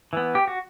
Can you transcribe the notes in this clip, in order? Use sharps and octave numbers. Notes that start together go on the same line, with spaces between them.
E3 B3
G4
F#4